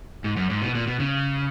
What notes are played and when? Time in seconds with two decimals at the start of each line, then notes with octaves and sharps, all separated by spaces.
0.24 G#2
0.36 F#2
0.50 G#2
0.62 B2
0.75 A#2
0.87 B2
1.00 C#3